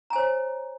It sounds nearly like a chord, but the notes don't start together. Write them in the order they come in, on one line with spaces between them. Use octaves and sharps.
A#5 G#5 C5 C#5